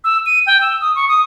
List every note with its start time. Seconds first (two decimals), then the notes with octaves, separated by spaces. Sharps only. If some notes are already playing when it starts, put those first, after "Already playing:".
0.04 E6
0.26 D#7
0.47 G5
0.61 E6
0.81 D#6
0.96 C#6
1.08 D#6